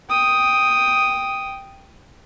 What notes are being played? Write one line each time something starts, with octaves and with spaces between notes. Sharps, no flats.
G5 D#6